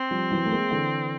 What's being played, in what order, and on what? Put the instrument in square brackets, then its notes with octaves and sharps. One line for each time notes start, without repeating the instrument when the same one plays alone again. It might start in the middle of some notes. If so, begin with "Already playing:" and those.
Already playing: [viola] C4
[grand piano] F3 G3
E3 F#3
A3
G#3 A#3
D3 E3